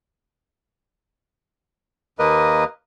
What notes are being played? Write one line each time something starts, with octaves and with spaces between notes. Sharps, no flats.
D#2 A#3 A#4 B4 D#5